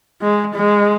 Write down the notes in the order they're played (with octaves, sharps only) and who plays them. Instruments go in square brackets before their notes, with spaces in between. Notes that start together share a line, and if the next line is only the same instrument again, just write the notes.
[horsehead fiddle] G#3
G#3